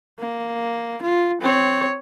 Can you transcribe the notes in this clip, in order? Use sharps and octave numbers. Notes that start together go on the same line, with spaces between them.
A#3
F4
C4 C#5